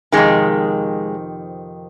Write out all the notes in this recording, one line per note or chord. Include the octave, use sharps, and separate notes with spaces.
F2 C3 D#3 G#3